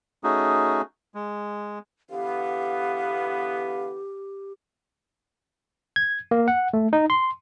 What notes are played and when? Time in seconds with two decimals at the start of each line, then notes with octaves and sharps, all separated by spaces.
0.24 A3 C#4 D#4 F#4 G#4
1.15 G#3
2.10 D3 E3 B3 G4 F5
5.96 G#6
6.31 A#3
6.48 F#5
6.74 A3
6.93 D#4
7.10 C6